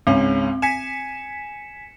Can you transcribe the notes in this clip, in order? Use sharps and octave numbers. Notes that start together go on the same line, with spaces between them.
C#2 G#2 C4 C#4
G#5 B6 C#7 E7